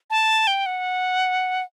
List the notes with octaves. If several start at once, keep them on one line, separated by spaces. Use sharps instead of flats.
A5
G5
F#5